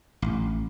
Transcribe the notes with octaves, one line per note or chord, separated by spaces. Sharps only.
A1